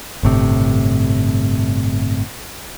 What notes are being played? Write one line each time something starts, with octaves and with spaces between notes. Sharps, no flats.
G1 A2 C3